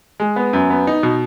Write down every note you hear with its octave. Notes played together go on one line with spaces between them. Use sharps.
G#3
B3
F#2
B3
D#4
B2